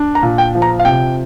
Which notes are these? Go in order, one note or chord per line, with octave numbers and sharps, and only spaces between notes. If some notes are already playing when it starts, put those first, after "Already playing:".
Already playing: D4
A#5
A#2
G5
F3
A#5
F5
C3 G5